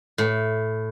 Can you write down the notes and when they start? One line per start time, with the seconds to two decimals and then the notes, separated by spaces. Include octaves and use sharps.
0.18 A2